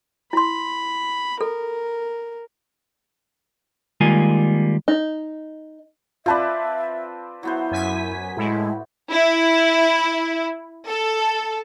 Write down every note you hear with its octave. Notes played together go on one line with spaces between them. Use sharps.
E4 B5 C6
A4 A#4
D#3 G3 G#3 A#3 F4 G#5
D#4
C4 F4 B4 D5 E5 A5 B5
F#3 B3 E4 C5
F#2 G#5 B6
A2 G#3 E4
E4
A4